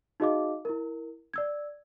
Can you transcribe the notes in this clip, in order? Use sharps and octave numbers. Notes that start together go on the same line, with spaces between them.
D#4 F#4 G#4 D#5 F5 D6
E4 A#4
D5 E6 G#6